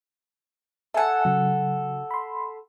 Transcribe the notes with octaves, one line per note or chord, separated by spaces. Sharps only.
A4 E5 F#5 G#5 A5
C#3 F#3
B5 C6